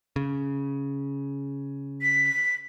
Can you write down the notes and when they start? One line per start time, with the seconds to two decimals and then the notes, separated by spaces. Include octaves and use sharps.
0.16 C#3
2.02 B6